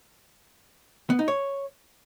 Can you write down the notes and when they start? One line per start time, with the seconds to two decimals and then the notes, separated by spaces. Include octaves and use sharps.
1.10 B3
1.19 D#4
1.28 C#5